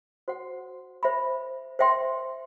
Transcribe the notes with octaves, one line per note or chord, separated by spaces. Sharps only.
F#4 C5 F#5
C5 E5 B5
C5 E5 G5 C6